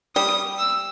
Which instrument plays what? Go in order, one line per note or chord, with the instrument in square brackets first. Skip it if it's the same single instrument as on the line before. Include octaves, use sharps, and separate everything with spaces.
[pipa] G3 [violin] D#6
[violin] E6